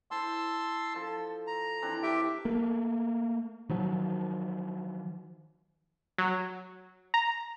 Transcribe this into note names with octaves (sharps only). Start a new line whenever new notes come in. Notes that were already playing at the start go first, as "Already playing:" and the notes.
E4 C5 A5 C6 E6
F3 A4
A#5
E3 C4 D4
G4 E5 G5
A3 A#3
D#3 F3 F#3
F#3
A#5